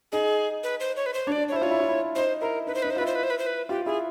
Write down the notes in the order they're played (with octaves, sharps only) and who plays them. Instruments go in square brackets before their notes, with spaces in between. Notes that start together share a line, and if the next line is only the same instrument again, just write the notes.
[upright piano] D#4 [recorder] G#4
[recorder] B4
C5
C#5
B4
C5
[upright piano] D4 [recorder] C#5
[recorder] D5
C#5
[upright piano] E4 [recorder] C5
[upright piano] F4 [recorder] C#5
[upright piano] E4
F4
E4
[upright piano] D#4 [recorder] C5
[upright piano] E4 [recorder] A#4
[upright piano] D#4 [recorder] B4
[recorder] C5
[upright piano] D#4 [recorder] B4
[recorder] C5
[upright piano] E4 F4 [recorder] B4
[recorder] C5
B4
C5
B4
C5
B4
[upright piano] F4 [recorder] G4
[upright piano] E4 [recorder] G#4